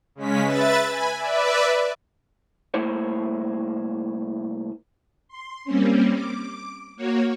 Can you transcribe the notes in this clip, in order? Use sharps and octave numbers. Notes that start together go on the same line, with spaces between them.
C#3 G#3 C#4 B6
B4 E5 A6
G#5 B5
B4 D5 E5
C2 A3 A#3 E4 C5 C#5
C6
G3 A#3 C4 C#4
D6
A#3 F#4 C#5